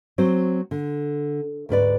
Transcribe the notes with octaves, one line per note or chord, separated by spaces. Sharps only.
F#3 C4 C5
D3
D2 G#2 B4 D5